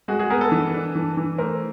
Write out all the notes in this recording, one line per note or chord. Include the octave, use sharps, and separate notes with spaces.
G#3 F#4 G#4
F#4 G#4
B3 G#4 A#4
A4 B4
E3
D4
E3
E3
A3 A#4 C5